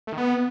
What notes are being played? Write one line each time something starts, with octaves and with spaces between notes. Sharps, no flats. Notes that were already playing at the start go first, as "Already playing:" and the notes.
A3
D#3
B3